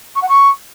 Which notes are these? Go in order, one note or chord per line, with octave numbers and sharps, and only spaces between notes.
C#6
F#5
C#6